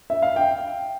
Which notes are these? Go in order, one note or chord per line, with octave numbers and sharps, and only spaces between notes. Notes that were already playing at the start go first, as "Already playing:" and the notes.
E5
F5
G5